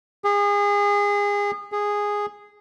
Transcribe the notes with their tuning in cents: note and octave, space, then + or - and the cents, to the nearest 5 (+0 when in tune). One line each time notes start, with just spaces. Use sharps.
G#4 -30
G#4 -10